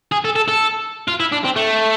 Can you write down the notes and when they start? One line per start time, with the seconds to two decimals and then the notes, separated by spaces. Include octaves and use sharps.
0.12 G#4
0.25 A4
0.36 A4
0.48 A4
1.08 F4
1.20 E4
1.32 D4
1.44 C4
1.56 A3